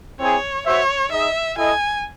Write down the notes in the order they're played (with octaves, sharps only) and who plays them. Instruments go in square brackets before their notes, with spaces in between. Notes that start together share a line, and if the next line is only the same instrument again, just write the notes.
[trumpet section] C4 E4 G#4 [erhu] C#5
[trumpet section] F#4 C5 E5 [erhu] C#5
[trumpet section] D#4 G#4 D#5 [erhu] E5
[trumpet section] E4 A4 D#5 [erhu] G#5